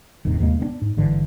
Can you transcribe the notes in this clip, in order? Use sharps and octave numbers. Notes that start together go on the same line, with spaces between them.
D#1 D#2 G#2 C3
D#2 C3 G#3 A#3
B3 C4 D4
G#2
G#1 G2 D3 E3